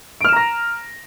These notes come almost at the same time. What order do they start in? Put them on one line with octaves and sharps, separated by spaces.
D7 F6 E7 A#5 A#6